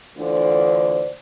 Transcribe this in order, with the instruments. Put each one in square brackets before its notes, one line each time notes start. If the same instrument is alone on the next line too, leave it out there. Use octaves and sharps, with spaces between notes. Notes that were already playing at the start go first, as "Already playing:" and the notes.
[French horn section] D2 D3 E3 F4 C5 D5